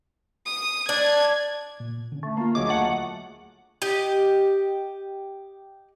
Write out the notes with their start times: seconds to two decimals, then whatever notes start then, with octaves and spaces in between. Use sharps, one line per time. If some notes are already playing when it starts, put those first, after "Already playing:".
0.46 D#6
0.89 D4 G#6
1.80 A#2
2.12 D3 C#4
2.23 A3
2.37 A#3 F4
2.55 E1 D2 F#3 D4 G#4 D#5 D6
2.68 A3 F#5
3.82 G4 D#5